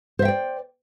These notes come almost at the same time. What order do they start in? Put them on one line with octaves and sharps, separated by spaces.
C5 E5 G5 D5